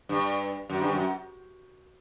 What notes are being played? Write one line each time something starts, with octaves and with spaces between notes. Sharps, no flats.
G2
F#2
G2
F#2